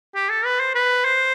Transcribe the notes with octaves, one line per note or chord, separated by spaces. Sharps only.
G4
A4
B4
C5
B4
C5